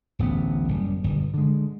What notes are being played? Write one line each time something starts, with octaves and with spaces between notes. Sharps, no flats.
D1 A1 A2 B3
F#1 G3
G1 B2
D3 G#3